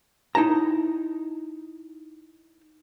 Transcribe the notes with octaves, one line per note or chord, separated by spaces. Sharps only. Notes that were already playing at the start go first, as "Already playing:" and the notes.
D#4 E4 A5 A#5